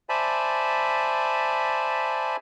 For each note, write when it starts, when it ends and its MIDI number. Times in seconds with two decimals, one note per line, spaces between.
0.09 2.36 72
0.09 2.36 74
0.09 2.36 76
0.09 2.36 80
0.09 2.36 81
0.09 2.36 83